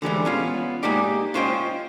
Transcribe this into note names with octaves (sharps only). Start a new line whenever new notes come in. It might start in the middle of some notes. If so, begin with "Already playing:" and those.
D3 E3 G3 G#3
B3 C#4 F4
G#3 A#3 D#4 G4 D5
C#4 F4 C5 D#5 E5 G5